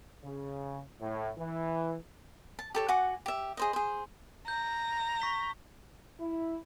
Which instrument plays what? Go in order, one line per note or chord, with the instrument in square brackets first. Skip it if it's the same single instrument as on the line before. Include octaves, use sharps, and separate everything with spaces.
[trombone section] C#3
A2
E3
[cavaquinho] A5
G4 A4 C#5
F#4 F#5 G#5 D6
G4 E5
G#4 C5 D#5
G#4 C5
[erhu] A#5 [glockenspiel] G6
[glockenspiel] C#6 B6 G7
[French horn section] E4